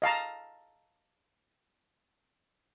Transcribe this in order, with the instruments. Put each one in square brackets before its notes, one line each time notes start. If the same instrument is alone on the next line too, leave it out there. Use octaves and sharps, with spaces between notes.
[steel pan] D#5 F5 A5 A#5